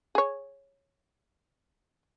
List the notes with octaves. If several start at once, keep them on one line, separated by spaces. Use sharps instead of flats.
G#4 C#5